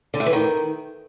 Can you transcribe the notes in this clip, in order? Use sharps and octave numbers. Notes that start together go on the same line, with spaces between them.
D3
A3
E3
D#3